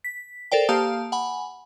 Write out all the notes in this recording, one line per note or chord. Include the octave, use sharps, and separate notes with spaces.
B6
A4 A#4 C5 D5 G5
A#3 G4 F5 A5 D#6
F#5 G#5 B5